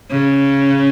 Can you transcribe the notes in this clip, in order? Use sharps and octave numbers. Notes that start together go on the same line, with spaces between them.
C#3